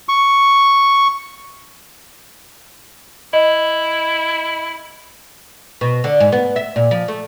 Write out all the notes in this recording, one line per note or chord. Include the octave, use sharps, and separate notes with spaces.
C#6
E4 D#5
B2
D3
G#2
B3
E5
A#2
F3
A3